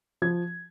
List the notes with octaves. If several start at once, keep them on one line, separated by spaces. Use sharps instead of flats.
F3 G#6